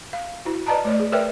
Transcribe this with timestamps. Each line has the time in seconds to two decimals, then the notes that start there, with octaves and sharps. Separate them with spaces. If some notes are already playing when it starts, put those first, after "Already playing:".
0.13 F5
0.45 E4 F#4
0.66 B4 D5 D#5 A5 A#5
0.85 A3 C#5 D5
1.00 G#4
1.12 A#4 B4 C#5 D5 E5 G5